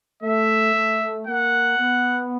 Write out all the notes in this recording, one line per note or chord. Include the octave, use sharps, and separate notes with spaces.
A3 E5
A3
A#3 F#5
B3